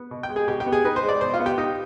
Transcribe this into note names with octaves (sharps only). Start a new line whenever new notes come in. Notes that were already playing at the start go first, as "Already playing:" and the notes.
Already playing: B3
B2
G5
G#3
G#4
B2 G4
G4
B3
G#4
D#4 B4
C5
G#3
D5
B2 C5
F4
B3
G4
D#4 G4